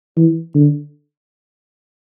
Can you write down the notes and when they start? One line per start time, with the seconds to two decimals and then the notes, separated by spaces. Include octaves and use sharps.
0.16 E3
0.55 D3